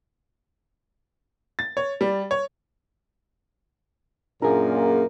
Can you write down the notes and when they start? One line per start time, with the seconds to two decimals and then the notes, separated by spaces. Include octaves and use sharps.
1.59 A6
1.77 C#5
2.01 G3
2.31 C#5
4.42 F#2 A#2 D4 G#4 A#4